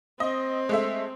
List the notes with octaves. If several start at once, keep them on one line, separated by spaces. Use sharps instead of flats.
C4 D#5
G#3 A3 E5